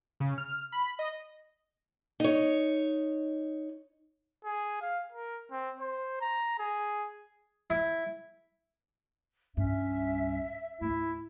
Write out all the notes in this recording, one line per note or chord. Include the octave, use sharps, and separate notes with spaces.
C#3
F6
B5
D#5
D#4 C#5
G#4
F5
A#4
C4
C5
A#5
G#4
E4
C2 G2 C#4 E5
D2 G#2 E4